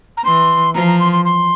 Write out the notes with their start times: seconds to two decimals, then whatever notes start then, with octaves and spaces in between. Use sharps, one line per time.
0.17 A#5
0.25 E3 C6
0.74 F3 A#5
0.87 A#5
1.00 C6
1.12 C6
1.25 C6